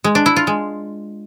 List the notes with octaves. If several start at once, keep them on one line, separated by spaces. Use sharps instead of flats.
G#3
D4
E4
F4
G#3